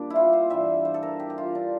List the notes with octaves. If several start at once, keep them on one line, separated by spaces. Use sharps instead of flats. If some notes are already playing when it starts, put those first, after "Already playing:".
Already playing: A#2 G3 D4 G4
E4
F4
C5
G2 E3 G3 E5
C5
A4
A#4
G4
G4
F4
D4